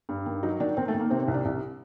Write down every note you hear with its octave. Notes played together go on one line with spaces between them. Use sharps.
G2
D#3
F#3 D#4
D#3 D4
D#3 C4
A3
D#3
A#3
C3 C4
C4
C2
D4
C2